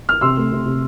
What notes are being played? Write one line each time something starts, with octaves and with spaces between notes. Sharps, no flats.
F6
C3 C6 E6
A3
C3
C3